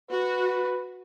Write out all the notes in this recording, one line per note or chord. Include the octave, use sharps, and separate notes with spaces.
F#4 B4